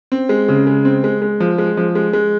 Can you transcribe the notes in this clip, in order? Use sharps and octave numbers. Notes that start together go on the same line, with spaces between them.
C4
G#3
C#3
G#3
C4
G#3
G#3
F3
G#3
F3
G#3
G#3